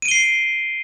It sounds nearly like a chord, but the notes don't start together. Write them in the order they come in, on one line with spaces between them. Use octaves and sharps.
D#7 D7 G7 C7